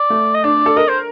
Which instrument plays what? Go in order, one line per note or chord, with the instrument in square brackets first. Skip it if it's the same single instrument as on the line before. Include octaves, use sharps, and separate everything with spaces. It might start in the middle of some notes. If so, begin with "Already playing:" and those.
Already playing: [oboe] D5
[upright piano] A3
[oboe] D#5
[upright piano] D4 [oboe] D5
[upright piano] A4
[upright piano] A#4 [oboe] D#5
[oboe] C5